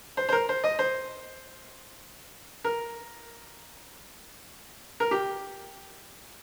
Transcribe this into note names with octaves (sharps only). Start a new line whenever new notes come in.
C5
C5
A#4
C5
D#5
C5
A#4
A#4
G4